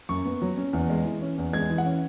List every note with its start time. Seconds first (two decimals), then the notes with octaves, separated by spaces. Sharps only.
0.09 F#2 C#6
0.25 B3
0.42 F#3
0.57 C#4
0.73 E2
0.90 G#3
1.05 E3
1.22 C#4
1.38 E2
1.53 G#3 G#6
1.70 E3
1.78 F#5
1.85 C#4